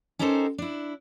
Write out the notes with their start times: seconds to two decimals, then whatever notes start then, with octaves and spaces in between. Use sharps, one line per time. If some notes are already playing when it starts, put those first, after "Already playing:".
0.19 C#4 D#4 G4 A4 A#4 C5
0.58 D4 E4